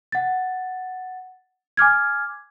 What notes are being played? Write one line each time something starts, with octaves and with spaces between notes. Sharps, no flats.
F#5 A6
G#5 D6 F6 G#6